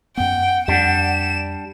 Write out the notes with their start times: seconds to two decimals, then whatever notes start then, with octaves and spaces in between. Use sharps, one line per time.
0.17 F#2 B3 F#5 G5
0.68 F2 G3 D4 E7